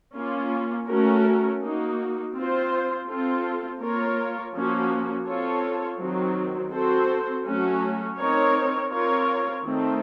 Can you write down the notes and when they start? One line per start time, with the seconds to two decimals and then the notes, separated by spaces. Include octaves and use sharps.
0.15 A#3 C#4 F4
0.87 A3 C#4 F#4 A#4
1.62 A#3 D#4 F#4
2.34 C4 F4 C5
3.07 C4 F4 A4
3.80 A#3 F4 A#4 C#5
4.53 F3 A#3 C#4 F#4
5.27 C4 F4 A4 C#5
5.99 D#3 F#3 C4
6.72 C4 F#4 A4 C5
7.45 F#3 A3 C#4 F#4
8.18 C4 D#4 A#4 C#5
8.91 C4 F4 A#4 C#5
9.64 D#3 A3 C4